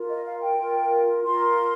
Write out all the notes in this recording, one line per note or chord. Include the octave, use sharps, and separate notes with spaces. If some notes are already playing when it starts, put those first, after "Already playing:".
Already playing: F4 A#4
D#5
F5
G5
F4 A#4
F4 A#4 C6